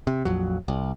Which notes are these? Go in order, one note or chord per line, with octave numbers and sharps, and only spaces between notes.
C3
A#1 F2 F#3
C2